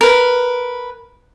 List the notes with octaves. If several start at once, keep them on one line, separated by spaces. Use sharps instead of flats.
A#4 B4